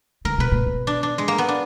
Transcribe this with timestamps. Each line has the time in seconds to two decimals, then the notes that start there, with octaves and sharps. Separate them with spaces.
0.25 D3 A#4
0.38 B2 B4
0.52 A#2
0.66 B2
0.87 D4
1.03 D4
1.18 G#3
1.28 A#3
1.38 B3
1.48 D4